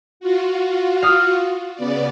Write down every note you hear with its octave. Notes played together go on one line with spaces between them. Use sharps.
F4 F#4
F5 D#6 F6
C#3 B3 D5